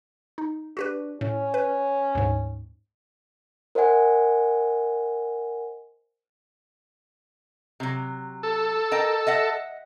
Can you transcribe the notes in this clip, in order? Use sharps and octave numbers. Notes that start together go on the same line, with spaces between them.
D#4
D4 F#4 G4 B4
A2 C#4
B4
D2 G#2
A#4 C5 D#5 F#5 G#5
C3 F#3
A4
A#4 D#5 G5
D#5 E5 F#5